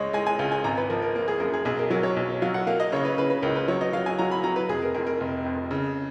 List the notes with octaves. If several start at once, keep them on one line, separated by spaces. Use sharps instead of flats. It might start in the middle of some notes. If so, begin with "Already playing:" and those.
Already playing: C#2 G#3 C#5 D#5
G#3 G#5
G#5
C#2 F5
G#5
G#1 A#5
B4
F3 A#4
A#4
A#3 A#4
G#4
F#2 A#4
G#4
B1 G#4
A#4
F#3 A#4
C#5
B1
F#3 F5
F#5
A#3 F5
D#5
C#3 C#5
B4
C#3 B4
B4
C#2 A#4
B4
F#3 C#5
D#5
F#3 F5
G#5
F#3 A#5
B5
F#3 A#5
B4
F1 G#4
A#4
F2 A#4
A#4
F1
F2
C#3